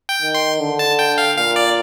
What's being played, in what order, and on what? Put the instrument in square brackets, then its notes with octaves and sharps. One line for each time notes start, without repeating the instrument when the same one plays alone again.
[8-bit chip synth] G5
[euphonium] D#3
[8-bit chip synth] C6
[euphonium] D3
[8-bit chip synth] A5
G5
F5
[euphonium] A#2 [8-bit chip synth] F5
[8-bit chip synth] D5